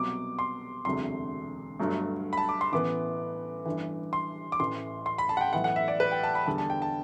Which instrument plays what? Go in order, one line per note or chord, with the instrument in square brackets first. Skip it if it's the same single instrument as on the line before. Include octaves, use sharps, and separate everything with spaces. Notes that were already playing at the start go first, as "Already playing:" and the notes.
Already playing: [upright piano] C2 B2 F#3 [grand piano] D6
[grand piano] C6
[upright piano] E1 D2 C3 F#3 [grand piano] C6
[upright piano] G1 G2 F#3 A3
[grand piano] B5
A5
D6
C6
[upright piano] A1 A2 E3 B3 [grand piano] D6
[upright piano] G1 G2 E3
[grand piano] C6
D6
[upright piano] A1 A2 E3 [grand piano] C6
[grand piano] C6
B5
A5
F#5
G5
[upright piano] B1 A2 E3 [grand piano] F#5
[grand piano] F#5
E5
D5
B4
G5
A5
B5
[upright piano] E2 D3 G3 [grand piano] A5
[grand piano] A5
G5
A5